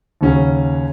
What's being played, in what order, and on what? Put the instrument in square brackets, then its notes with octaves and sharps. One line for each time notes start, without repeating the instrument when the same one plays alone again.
[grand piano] D#2 C#3 F#3 C#4